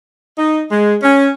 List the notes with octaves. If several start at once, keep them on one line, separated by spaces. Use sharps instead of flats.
D#4
G#3
C#4